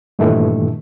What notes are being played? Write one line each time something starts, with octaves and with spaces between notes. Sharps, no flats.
G2 A#2 D#3 E3 A3